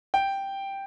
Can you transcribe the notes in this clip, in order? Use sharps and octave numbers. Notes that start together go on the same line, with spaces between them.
G5